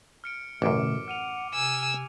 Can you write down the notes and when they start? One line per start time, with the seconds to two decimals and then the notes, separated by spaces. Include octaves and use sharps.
0.24 F6 C#7 D7
0.62 A1 F#2 B2 D3 A3 D6 D7
1.08 F#5 F6 D#7 F7
1.54 C3 G#5 E6